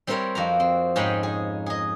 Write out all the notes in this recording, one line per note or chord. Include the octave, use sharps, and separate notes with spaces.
G3 C4 E4 A#4 C5 C#5
F2 F#4 A#4 A#5
C4
G#2 G#3 C#4 D#4 G5 B5
G#4
G#4 D#5